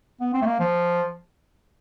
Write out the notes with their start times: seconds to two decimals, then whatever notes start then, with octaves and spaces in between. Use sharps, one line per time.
0.21 B3
0.34 C4
0.42 A3
0.46 A#3
0.60 F3